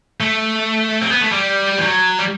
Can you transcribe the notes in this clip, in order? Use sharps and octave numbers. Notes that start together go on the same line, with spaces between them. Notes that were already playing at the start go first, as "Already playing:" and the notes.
A3
C4
B3
A3
G3
E3
F#3
G3